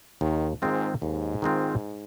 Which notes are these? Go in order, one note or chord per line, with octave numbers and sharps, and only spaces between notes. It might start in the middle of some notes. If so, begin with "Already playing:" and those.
D#2 D#3
G#2 D#3 G#3 C4 F4
D#2 G#2
D#3 G#3 C4 F4